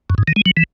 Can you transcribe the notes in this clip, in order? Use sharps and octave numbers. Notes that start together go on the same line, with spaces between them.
F#2
G#2
D#3
G#3
F#3
E3